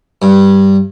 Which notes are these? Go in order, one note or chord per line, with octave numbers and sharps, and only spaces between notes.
G2